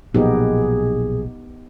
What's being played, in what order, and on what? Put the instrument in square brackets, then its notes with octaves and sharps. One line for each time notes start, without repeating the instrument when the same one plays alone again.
[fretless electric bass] B1 A#2 F3 [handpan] B3 D#4 G4 [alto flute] G#4